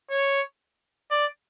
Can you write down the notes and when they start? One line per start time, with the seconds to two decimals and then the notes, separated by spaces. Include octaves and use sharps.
0.11 C#5
1.11 D5